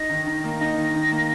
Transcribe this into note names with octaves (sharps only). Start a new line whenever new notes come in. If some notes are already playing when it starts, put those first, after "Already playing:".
Already playing: D#4 A#6
D#3
D#3
A#3
D#4 A#6
D#3
D#3
A#3